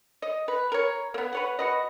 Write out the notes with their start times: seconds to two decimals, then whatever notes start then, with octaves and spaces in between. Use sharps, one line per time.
0.22 D#5
0.48 B4
0.72 A#4 C#5
1.14 A#3 B3
1.33 B4 C#5 F#5
1.59 F#4 B4 D#5